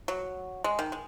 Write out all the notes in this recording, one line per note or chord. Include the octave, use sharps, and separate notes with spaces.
F#3
G#3
D#3
G#3